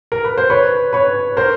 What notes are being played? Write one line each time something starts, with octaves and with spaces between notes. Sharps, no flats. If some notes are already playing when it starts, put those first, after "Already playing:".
A#4
B4
C5
B4 C#5
B4 C#5
A#4 C5